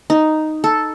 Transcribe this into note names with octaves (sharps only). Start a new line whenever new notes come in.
D#4
A4